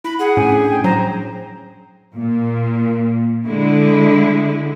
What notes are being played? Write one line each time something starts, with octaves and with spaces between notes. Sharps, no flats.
E4 B5
G#4 F#5
A2 C#4 G#5
C#4 D4
G5
F#3 C5 A#5
A#2
D3 G#3 E4